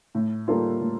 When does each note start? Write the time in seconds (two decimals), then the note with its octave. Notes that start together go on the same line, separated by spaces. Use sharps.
0.15 A2
0.48 G3 A#3 F4 A4
0.81 A2